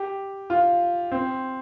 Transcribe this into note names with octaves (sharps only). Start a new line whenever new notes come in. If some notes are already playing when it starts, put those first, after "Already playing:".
Already playing: G4
F4
C4